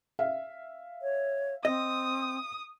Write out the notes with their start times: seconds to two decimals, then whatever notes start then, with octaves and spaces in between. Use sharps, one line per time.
0.19 E5 F5
1.02 C#5
1.65 C4 D#5 D#6